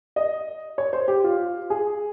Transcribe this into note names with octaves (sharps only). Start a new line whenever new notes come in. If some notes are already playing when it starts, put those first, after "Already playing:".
D#5
C#5
C5
G4
F4
G#4